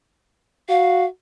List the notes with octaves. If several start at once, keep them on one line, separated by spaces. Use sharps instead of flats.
F#4 F5